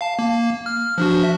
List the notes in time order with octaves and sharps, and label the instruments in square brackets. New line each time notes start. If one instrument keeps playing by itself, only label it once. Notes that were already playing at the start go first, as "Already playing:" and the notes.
[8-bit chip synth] F5 A5
A#3
F6
F3 D4 F#4
E5